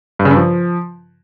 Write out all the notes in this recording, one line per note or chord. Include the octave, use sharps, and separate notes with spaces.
G2
C#3
G2
F3